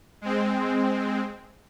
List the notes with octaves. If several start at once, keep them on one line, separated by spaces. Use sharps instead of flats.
G#3 C4